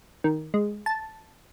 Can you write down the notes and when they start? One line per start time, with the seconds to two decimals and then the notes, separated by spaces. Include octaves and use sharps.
0.24 D#3
0.54 G#3
0.86 A5